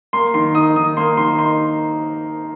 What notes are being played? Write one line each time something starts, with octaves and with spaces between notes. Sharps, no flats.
A#3 C6
D#3 C6
D#4 D#6
D#3 D#6
A#3 C6
D#3 C6
D#4 C6